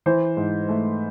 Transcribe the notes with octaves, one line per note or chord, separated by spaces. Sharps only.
E3 C5
G#2
A3